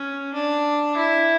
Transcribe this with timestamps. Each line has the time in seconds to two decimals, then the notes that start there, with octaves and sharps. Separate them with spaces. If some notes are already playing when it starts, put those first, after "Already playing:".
Already playing: C#4
0.34 D4
0.97 E4